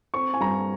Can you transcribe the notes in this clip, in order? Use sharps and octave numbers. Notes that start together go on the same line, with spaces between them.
C4 C#6
G#5
G2 A#5